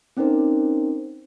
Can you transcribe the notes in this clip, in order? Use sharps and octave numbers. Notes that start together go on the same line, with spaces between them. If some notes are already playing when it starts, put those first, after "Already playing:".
C4 C#4 D#4 A#4 C5